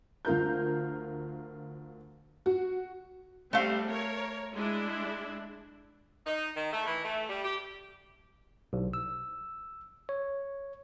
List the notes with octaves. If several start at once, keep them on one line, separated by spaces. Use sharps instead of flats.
D2 F4 A#4 G6
F#4
G3 A3 C4 F5
A#4 C#5
G#3 D4 E4
D#4
D#3
A3
E3
A3
G3
G4
B1
E6
C#5